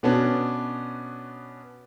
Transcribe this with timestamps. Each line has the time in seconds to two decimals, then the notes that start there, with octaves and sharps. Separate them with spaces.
0.03 B2 B3 C#4 D4